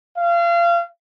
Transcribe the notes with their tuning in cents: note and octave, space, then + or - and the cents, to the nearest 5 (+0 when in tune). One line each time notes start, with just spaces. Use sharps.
F5 -30